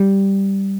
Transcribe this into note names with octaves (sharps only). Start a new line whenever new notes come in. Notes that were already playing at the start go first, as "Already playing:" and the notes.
Already playing: G3